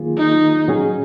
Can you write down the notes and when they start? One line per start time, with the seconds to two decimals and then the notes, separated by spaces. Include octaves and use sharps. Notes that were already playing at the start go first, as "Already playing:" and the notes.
Already playing: D#3 F#3 A#3 F4 G#4
0.17 D#4
0.68 A#2 F#3 C#4 G#4